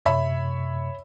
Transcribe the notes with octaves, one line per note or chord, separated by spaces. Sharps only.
F#2 C3 C#5 E5 B5